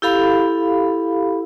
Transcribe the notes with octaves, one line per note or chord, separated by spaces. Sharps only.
E4 G4 A4 F5 B5